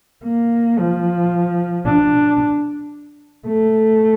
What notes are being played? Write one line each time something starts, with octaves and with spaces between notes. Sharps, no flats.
A#3
F3
D4
A3